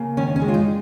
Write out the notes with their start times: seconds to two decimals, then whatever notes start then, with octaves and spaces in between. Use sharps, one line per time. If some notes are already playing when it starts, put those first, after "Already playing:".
Already playing: C#3 A#3
0.17 D#3 C#4
0.36 C#4
0.42 G#3
0.48 F4
0.54 D#4